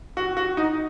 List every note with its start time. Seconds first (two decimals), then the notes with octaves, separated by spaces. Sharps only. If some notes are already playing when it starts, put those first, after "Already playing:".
0.17 F#4
0.37 F#4
0.57 D#4